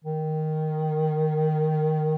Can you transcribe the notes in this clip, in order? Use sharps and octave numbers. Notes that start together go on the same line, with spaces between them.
D#3